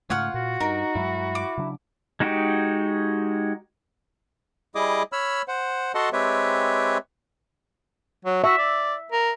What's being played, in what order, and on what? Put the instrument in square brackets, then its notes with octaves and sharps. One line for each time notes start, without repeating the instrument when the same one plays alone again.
[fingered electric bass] G#2 C#3 A3 [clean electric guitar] F4 [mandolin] C#5 F#5 F6
[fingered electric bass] A#2 [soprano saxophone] F#4
[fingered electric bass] G2 [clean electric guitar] D#4 [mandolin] A#4
[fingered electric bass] G2 F#3 G#3 [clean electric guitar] E4
[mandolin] D6
[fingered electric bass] C#3 F#3 D4
[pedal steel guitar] G#3 D#4 F#4 G4
[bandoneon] G3 E4 G#4 D#5 D6 D#6
C#5 B5 E6 F6
C5 F#5
F#4 A4 D#5 F#5 A5 C6
G#3 C4 G4 B4 C#5 E5
[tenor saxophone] F#3
[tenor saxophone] F#4 [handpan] E5
[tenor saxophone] D5
A#4